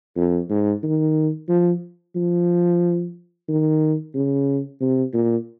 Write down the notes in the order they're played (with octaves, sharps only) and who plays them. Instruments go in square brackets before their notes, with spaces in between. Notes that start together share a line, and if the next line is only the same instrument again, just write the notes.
[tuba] F2
G#2
D#3
F3
F3
D#3
C#3
C3
A#2